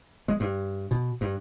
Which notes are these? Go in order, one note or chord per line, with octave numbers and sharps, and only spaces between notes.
G#3
G2
B2
G2